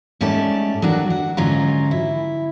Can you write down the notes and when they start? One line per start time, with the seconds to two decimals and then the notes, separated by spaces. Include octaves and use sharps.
0.21 G#2 G3 A3 C#4 D5 A5
0.82 D#2 F#3 D4 F#4 A#4
1.10 F#5
1.37 G#2 D3 F#3 C#4 F4 A#5
1.91 E4